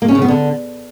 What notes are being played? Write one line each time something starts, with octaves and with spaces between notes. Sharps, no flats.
A#3
C#4
C#3
B3
D3